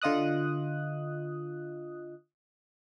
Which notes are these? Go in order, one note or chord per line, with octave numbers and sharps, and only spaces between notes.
D3 F4 D#5 D#6 F#6